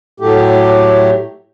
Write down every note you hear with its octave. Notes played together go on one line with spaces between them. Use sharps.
A2 F#3 A3 G4